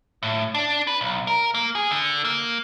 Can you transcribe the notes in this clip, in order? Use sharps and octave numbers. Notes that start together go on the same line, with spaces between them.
A2
D4
B4
B1
A#4
A#3
G#4
D3
A#3